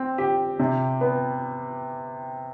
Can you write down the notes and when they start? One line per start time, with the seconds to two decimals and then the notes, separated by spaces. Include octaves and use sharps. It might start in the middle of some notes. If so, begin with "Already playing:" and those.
Already playing: C4
0.18 G4
0.59 C3
1.01 B3